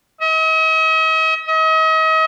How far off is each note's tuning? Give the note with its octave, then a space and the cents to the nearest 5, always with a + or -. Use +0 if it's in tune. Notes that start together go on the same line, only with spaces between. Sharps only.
D#5 +45
D#5 +40